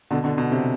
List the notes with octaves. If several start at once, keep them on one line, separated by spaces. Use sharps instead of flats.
B2 D3
B2 D3
B2
C3